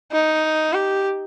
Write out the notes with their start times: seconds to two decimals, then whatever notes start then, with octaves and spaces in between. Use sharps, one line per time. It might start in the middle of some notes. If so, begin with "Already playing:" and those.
0.12 D#4
0.73 G4